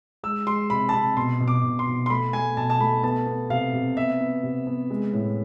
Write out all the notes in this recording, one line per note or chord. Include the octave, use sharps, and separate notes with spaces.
G#3 E6
G#3 C6
C3 B5
A5
C3 B5
B2 C6
B2
D6
B2
C6
B2
C6
A3 B5
A3 G#5
B2 A5
A5
A3 B5
B3 A5
B3
C3 F5
C3
B3 E5
B3
C3
B3
G#3
A2